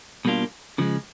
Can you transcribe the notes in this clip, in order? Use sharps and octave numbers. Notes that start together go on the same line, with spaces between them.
B2 G3 A#3 D4 F4
C#3 F3 G#3